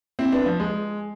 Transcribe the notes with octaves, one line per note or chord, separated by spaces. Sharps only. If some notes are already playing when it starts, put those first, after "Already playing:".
C4 E4
B3 D4
F3
G#3